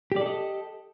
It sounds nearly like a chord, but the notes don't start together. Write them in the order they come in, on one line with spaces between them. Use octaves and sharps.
G4 D5 A4 D#5